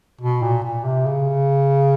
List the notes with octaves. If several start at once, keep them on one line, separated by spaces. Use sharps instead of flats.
B2
A#2
A#2
C3
C#3